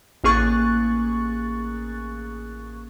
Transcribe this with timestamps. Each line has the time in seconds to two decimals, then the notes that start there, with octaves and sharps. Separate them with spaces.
0.24 A1 A#3 G#4 C#6 F#6 A6